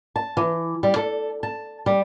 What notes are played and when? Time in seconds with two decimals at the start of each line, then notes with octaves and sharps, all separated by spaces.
0.16 A5
0.37 E3
0.83 G3
0.96 A4
1.43 A5
1.86 G3